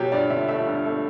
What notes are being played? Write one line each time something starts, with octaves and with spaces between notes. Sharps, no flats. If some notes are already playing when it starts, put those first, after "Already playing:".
Already playing: B2 F#3 G4
G2 D5
D3 E5
A3 E5
G2
A3